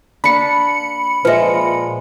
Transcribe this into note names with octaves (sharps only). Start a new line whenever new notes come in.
A#3 D4 B5 C#7
A#2 F3 G#3 B4 E5